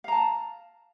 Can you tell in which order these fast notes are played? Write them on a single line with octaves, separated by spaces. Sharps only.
F5 A#5 A5